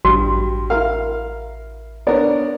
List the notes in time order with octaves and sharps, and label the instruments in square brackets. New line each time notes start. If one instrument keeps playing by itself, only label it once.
[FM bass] A1 [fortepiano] G2 [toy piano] F#4
[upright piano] E4 A#4 [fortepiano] F5
[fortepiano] B3 D4 A#4 [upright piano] C#5 D5